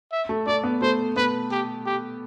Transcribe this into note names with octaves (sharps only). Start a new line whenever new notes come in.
E5
A3
A3 D5
B3
A3 C5
B3 B4
G4
G4